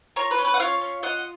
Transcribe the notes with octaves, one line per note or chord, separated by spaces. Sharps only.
F4 A#4 C#5
B4
C#4
B4
F#5
F4 C#5 F5
C#4
F4 D#5 F#5